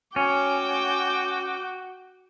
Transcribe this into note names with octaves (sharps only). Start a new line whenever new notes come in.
C#4 F#4 G5 D6